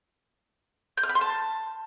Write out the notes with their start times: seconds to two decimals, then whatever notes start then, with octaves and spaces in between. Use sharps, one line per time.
0.97 G6
1.03 F6
1.09 B5
1.15 C6
1.21 A5